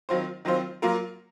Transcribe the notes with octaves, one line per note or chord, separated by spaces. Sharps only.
D#3 F#3 C4 F4 C5
D#3 F#3 C4 F4 C5
F#3 A#3 F4 A#4